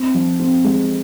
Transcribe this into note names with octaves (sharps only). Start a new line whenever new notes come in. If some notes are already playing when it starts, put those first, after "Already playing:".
Already playing: C4
F3
C4
G#3